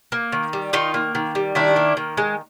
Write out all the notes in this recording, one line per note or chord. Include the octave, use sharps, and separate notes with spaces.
A#3
D#3
G3
D#3 D#4 F4
A#3
D#3
G3
D#3 D4 E4
A#3
D#3
G#3